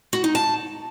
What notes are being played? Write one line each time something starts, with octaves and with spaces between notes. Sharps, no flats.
F#4
D#4
A5